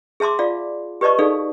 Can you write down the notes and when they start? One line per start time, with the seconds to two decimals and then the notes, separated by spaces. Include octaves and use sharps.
0.20 G#4 E5 A5 C6 D6
0.39 F4 D5 F5
1.01 G4 B4 D5 D#5 A5 C#6
1.19 D#4 G#4 A4 D5 F5